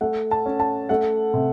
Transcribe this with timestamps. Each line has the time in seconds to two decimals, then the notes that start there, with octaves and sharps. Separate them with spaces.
0.01 A3 F#5
0.31 A5
0.46 C#4
0.60 A5
0.89 A3 F#5
1.34 C3